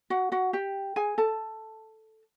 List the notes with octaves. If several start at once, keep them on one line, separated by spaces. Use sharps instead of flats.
F#4 F#5
F#4 F#5
G4 G5
G#4 G#5
A4 A5